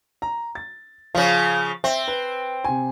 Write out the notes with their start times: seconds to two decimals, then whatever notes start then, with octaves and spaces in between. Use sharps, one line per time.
0.22 A#5
0.55 A6
1.15 C#3 F3 F5
1.84 C4 E5
2.08 B4
2.64 C3 G#5